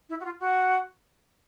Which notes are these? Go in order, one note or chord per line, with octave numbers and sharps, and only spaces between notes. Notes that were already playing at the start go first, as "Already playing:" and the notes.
E4
F#4
F4
F#4